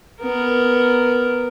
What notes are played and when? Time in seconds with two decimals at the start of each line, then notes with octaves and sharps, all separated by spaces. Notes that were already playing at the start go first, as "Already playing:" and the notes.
0.21 B3 A#4